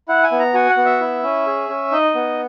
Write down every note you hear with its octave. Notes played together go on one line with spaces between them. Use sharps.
E4 F#5
G#5
B3
A#5
F#4 G#5
F#5
B3
E5
E4
C#4
G#4
C#4
D#4 D#5
B3